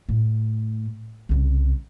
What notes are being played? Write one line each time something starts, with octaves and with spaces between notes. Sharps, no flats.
A2
C2 C#3